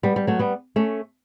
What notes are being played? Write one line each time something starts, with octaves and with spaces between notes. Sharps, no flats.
G3 B3
G3
F#3 A3
G3 B3
A3 C#4